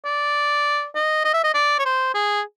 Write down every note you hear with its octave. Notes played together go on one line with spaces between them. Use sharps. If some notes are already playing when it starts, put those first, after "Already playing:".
D5
D#5
D#5
E5
D#5
D5
C#5
C5
G#4